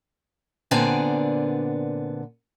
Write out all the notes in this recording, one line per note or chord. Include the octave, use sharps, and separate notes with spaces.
A#2 D3 B3 C4 D5 G#5